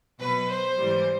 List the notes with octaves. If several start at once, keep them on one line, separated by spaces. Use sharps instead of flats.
B2 F#3 B4
C5
G#2 E3 G3